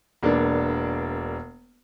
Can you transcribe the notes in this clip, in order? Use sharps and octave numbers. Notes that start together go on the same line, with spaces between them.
E1 A#3 B3 D4